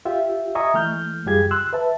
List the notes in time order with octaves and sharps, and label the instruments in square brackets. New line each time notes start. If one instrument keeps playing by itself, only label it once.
[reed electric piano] F4 G4 E5 G5
D#5 E5 G#5 A#5 C#6 D#6
E3 A3 F6 G6
F#2 G3 F4 G4 G#4 G#6
C6 E6 F#6
B4 E5 A5